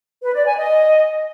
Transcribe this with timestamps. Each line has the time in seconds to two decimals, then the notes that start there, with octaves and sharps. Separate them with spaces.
0.22 B4
0.34 D5
0.46 G#5
0.57 D#5